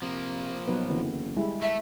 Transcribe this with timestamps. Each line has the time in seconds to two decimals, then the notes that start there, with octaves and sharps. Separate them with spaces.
0.02 C3 F3 A#3
0.67 B2 F#3 D#4 B4
0.89 F#1 D3 E3 B3
1.37 G3 G#3 E4
1.62 A3 E5